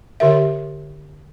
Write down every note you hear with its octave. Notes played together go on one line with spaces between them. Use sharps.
D3 G4 A#4 E5